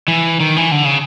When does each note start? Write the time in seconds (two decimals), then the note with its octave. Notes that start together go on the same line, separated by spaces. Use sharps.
0.08 E3
0.40 D#3
0.56 E3
0.72 D3
0.85 C#3